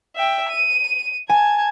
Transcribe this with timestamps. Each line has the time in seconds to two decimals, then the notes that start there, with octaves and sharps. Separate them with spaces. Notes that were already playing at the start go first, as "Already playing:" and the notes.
0.16 E5 G5
0.49 D#7
1.30 G#5 A5 G#6